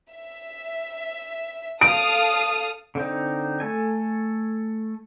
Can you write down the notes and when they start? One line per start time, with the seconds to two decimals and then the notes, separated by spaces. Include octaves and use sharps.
0.10 E5
1.81 A4 F5 D#6 D7
2.95 D3 C4 D#4
3.60 A3 A4 G#5